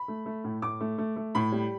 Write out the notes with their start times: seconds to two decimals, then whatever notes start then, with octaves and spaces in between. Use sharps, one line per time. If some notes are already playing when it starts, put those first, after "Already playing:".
Already playing: B5
0.08 A3
0.26 A3
0.44 A2
0.62 A2 D6
0.81 A3
0.98 A3
1.16 A3
1.35 A2 B5
1.52 G3